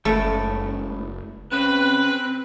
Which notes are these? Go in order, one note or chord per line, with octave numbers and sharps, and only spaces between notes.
F#1 C#2 A2 A3
C#3 C4 B4